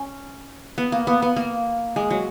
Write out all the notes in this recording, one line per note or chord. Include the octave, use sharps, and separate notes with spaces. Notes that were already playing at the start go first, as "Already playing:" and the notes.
Already playing: C#4
B3
A#3
B3
B3
A#3
G#3
F#3